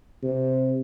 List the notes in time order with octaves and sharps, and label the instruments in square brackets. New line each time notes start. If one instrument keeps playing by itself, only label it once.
[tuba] C3